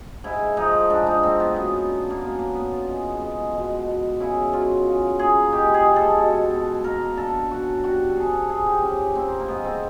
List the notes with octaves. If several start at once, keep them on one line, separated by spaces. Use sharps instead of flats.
G#2 E4
F3 D#4
G#2 D4
D#4
A#3 C4
B3
F#2 B3
D3
A#3
F#2 B3
A#3
F#3 B3
F4
G#3
G#3
B2
B2
C#3 E4
F#3 F4
C#3
A#3 G#4
G#3 G4
G#4
G#3
A4
B2
B2
A#3 A#4
D3 A4
F#2 F#4
G3 F#4
A4
C3 G#4
A4
F3 G#4
G4
C3 C#4
A#3 C4
A#3
G#2 B3
C4